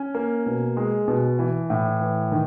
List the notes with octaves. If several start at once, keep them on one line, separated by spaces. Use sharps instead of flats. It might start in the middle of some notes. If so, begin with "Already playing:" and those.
Already playing: C#4
A#3
B2
G#3
B2
E3
A2
E3
D#3